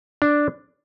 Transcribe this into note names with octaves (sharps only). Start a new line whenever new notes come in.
D4